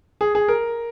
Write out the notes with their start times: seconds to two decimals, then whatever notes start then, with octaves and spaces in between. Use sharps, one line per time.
0.21 G#4
0.35 G#4
0.48 A#4